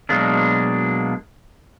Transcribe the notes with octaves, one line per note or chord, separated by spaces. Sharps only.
B2 F#3 G#3 A#3 D4